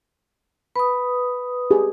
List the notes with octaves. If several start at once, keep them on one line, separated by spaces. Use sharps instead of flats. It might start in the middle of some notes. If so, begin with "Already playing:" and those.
B4 B5 D#6
G4 G#4